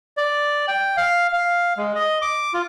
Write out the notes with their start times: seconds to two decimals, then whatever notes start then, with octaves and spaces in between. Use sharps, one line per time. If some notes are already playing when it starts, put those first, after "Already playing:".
0.17 D5
0.68 G5
0.97 F5
1.33 F5
1.77 G#3
1.95 D#5
2.22 D6
2.54 F4